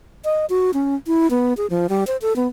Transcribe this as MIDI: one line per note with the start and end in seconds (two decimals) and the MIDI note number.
0.25 0.46 75
0.50 0.71 66
0.74 0.95 61
1.07 1.29 64
1.31 1.54 59
1.57 1.67 68
1.70 1.87 53
1.89 2.04 55
2.07 2.17 72
2.22 2.35 69
2.36 2.47 59